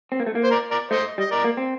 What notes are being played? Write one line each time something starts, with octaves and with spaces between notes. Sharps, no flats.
C4
A#3
A3
A#3
C5
A#4 D5
A#4 D5
A3 C5 D#5
G3 D#5
A#4 D5
A#3
C4